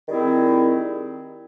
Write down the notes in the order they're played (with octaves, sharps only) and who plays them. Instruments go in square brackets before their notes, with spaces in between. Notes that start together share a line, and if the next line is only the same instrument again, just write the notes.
[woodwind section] D#3 G3 C4 E4 G#4